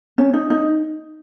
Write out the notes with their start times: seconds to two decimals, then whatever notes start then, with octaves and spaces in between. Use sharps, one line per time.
0.18 C#4
0.34 D#4
0.50 D#4